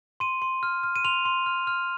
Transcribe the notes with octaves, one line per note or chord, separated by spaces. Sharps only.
C6 D#7
C6
F6
F6
D#7
C6 F7
C6
F6
F6